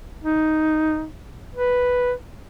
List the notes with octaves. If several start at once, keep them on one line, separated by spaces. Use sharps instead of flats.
D#4
B4